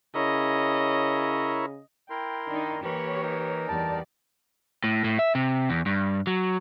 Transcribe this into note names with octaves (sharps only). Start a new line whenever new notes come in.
C#3 E4 A#4 C#5 D#5
E4 A#4 G5 C6
D#3 D4 D#4
E3 A#3 G4 A#4 C#5 B5 C#6
D#4 A#4
E2 G3 D5 A5
A2
A2
E5
C3
E2
G2
F#3